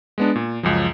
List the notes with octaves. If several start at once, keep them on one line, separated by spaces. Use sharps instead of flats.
G#3 B3 D4
A#2
C#2 F#2 F3